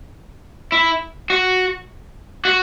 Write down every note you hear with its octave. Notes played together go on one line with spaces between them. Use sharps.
E4
F#4
F#4